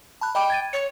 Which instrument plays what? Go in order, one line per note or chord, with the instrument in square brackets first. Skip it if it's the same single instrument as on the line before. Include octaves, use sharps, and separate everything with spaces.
[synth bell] A5 B5 F#6
[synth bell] D#5 B5 D6 [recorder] G5
[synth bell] G#6 A6 D#7
[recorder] C#5 [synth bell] C#7